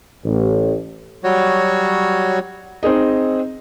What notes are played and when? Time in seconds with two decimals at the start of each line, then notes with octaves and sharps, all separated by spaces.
0.24 A1
1.24 F#3 G3 F#4 C#5
2.83 C4 D#4 G#4 D#5